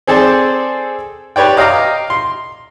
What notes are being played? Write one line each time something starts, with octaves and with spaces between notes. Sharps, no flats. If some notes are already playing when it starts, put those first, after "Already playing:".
C4 G#4 A4 C5 D5
G4 B4 C#5 D5 G5
D#5 F5 G5 A#5 D6
C6